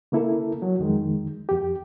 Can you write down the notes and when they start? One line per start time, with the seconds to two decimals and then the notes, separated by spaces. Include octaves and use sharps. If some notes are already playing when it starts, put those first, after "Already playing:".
0.12 C#3 A#3 E4 A4 A#4
0.62 F#3
0.79 F2 D#3 G#3
1.49 F2 G4